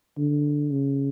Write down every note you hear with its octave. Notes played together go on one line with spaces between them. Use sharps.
D3
C#3